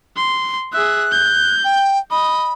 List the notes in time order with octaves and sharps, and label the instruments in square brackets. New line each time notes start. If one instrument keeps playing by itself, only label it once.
[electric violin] C6
[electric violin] G#4 E5 [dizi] F#6
[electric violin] G6
[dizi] G5
[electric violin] D#5 [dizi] B5